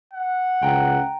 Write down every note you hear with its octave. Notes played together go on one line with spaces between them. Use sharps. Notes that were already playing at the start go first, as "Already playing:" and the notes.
F#5
C#2 G5 A#5